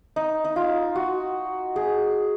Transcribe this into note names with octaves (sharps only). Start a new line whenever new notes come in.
D#4
D#4
F4
F#4
G#4